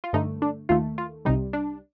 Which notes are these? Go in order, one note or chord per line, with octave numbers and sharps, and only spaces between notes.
F4
G2 D3 A3 D#4
D4
D#2 D#3 A3 F4
F4
C2 C3 G3 D#4
D4